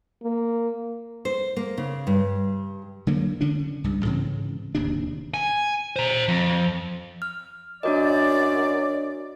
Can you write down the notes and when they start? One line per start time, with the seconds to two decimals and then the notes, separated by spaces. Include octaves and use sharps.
0.23 A#3
1.25 C5
1.57 A#3
1.78 C#3
2.07 G2
3.07 D3 F#3 A#3
3.41 D3 C#4 D4
3.84 C2 G2
4.05 G#2 C#3 E3 C4
4.75 D1 D#2 C3 D4
5.34 G#5
5.96 C5 A#5
6.28 F2
7.22 F6
7.83 F#2 D4 F#4 D5 D#5